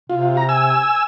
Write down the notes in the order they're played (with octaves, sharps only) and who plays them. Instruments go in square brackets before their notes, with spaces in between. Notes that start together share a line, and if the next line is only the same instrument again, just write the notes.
[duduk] C3 [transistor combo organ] F4
[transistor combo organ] A#5
G#5 E6